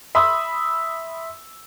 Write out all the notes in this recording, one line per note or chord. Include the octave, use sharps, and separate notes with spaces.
E5 B5 C6 D#6 E6